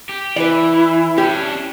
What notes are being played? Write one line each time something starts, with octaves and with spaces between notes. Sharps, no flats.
G4
E3 E4 B4 D5
C#4 D4 G4